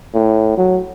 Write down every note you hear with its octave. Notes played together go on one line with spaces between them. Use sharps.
A2
F#3